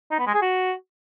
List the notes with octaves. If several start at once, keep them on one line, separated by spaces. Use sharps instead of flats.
D#4
B3
G#3
G#4
F#4